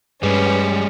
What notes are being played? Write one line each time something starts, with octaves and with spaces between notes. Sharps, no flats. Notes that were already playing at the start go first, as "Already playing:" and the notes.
G2 G3 G#3 C#4 B4